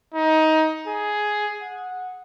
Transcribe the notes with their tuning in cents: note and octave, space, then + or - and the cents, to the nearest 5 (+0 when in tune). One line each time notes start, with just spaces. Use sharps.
D#4 +20
G#4 +10
F#5 -10